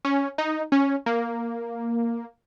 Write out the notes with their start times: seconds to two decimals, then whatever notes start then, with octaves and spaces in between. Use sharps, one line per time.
0.05 C#4
0.38 D#4
0.72 C#4
1.06 A#3